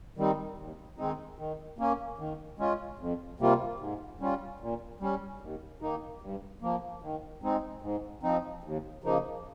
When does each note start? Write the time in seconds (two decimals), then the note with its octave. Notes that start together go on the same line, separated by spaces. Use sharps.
0.17 D#3 G3 C4 D#4
0.58 D#2
0.98 D#3 G#3 C4 D#4
1.38 D#3
1.79 A#3 C#4
2.19 D#3
2.59 G#3 C#4 F4
2.99 F2
3.39 C3 G3 A#3 F4
3.80 G#2
4.20 G3 C#4 F4
4.60 A#2
5.01 G3 C#4
5.41 D#2
5.81 D#3 A#3 D#4
6.22 G2
6.62 F3 A#3
7.02 D#3
7.43 G#3 C4 D#4
7.82 G#2
8.23 F3 C4 D#4
8.64 D#2
9.04 C#3 F3 A#3 D#4